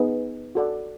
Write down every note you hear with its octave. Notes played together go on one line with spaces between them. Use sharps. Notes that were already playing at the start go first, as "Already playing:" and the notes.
Already playing: B3 D#4 G#4
F#4 A4 D5 F#5